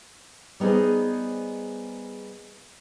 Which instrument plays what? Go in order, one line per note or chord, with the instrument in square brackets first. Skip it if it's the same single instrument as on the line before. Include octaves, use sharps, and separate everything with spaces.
[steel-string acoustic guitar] G3 B3 D#4 G#4 C5